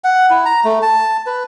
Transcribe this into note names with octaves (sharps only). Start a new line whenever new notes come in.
F#5
E4
A#5
A3
A5
B4